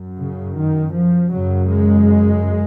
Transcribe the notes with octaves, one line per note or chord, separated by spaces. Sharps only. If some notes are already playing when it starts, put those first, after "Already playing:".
Already playing: F#2
C#3
D#3
F3
F#2 C#3 F#3
G#3